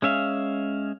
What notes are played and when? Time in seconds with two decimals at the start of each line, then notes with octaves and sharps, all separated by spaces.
0.02 G#3 C#4 E5 F5